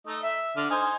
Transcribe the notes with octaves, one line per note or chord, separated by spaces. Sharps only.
A3 D#4 D#5
E5
D3 F6
D#4 C5 G#5